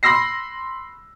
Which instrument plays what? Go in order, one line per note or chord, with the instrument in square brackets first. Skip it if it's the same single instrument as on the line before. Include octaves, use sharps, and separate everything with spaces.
[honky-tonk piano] B5 C6 E6 A#6 C7